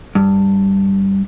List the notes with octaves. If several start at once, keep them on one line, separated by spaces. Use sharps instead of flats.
G2